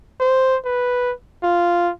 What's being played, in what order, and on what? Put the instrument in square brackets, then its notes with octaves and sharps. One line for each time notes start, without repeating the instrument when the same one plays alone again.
[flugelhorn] C5
B4
F4